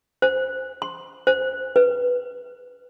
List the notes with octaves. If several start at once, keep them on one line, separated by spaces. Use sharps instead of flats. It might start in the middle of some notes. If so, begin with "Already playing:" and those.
C5
C6
C5
B4